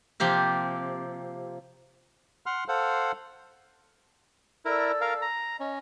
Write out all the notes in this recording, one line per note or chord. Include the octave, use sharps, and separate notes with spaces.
C3 F3 A#3 G4 A#4
F#5 C6 F6
A4 C5 F5 F#5
E4 A4 A#4 D5 E6
A#4 F5
A#5
C#4 D#5